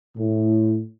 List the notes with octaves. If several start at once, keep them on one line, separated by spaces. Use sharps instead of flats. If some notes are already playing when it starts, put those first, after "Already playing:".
A2